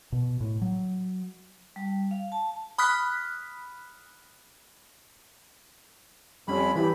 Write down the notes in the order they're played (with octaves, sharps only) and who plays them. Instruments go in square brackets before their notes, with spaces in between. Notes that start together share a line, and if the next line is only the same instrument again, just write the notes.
[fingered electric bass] B2
A2
F#3
[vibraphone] G3
F5
A5
[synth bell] B5 D#6 F6 F#6 B6
[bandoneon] F2 B5 [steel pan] G3 C#4
[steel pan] E3 E4 G4 [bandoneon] B5